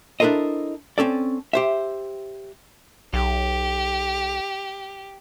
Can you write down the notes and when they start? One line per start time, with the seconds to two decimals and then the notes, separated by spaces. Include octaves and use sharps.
0.20 D4 E4 A4 A#4 C5 D#5
0.98 C4 C#4 A4 D5
1.53 G4 C5 E5
3.13 B1 G4